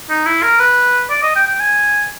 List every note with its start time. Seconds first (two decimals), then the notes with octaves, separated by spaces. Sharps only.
0.10 D#4
0.26 E4
0.43 A#4
0.59 B4
1.10 D5
1.22 D#5
1.36 G5
1.47 G5
1.60 G#5